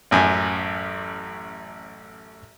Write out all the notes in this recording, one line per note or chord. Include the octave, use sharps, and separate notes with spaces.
A1 F#2 G#5